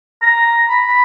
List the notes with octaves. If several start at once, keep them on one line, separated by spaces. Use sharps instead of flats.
A#5
B5
B5